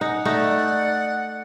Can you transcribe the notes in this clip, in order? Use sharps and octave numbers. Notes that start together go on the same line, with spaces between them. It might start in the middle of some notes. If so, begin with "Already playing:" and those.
D#4 F#5 G#5
A3 D#4 D5